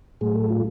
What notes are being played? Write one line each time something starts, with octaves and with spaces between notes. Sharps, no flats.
A2 F#3 A3 G#4
A4
F4